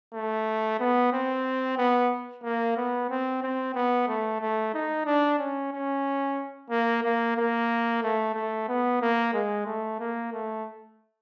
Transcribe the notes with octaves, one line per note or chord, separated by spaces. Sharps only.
A3
B3
C4
B3
A#3
B3
C4
C4
B3
A3
A3
D#4
D4
C#4
C#4
A#3
A#3
A#3
A3
A3
B3
A#3
G#3
A3
A#3
A3